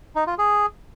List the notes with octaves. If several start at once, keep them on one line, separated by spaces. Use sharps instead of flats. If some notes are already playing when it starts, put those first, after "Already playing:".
D#4
F4
G#4